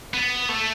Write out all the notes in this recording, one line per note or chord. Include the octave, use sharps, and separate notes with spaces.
B3
A3